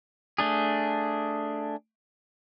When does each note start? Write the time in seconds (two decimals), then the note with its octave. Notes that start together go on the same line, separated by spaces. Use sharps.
0.38 A3 D4 G#4